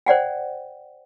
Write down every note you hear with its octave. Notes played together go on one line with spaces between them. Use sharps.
C5 D5 F#5 G5